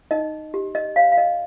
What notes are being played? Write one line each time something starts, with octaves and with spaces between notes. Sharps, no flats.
D#4 D#5
G4
D#5
C#5 F5
F5
D#5